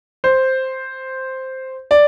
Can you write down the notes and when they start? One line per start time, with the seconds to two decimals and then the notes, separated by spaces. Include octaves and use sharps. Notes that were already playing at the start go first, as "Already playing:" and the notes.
0.24 C5
1.91 D5